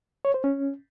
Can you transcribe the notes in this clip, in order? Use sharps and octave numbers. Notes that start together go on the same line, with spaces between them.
C#5
C5
C#4